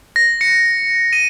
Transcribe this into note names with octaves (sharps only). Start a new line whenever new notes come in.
A#6
C#7
D#7